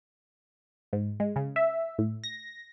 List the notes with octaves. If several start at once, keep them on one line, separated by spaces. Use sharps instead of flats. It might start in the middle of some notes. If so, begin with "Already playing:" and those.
G#2
G#3
C#3
E5
A2
A#6